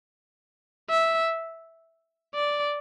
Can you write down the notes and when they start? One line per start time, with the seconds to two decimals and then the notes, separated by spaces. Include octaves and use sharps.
0.90 E5
2.35 D5